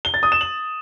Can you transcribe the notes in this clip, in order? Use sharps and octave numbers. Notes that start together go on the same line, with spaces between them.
G7
A6
D#6
E7
F#7